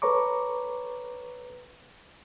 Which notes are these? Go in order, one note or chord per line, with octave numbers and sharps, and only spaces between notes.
A4 B4 C#5 A#5 C#6 D6